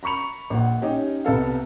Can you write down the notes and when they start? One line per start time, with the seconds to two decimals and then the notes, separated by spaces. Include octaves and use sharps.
0.03 A#5 B5 C#6 C#7 F7
0.50 A#1 F#5
0.81 C#4 D#4 G4 C#5
1.25 C2 B3 A4 F5